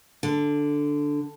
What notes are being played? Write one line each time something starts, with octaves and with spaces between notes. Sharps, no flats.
D3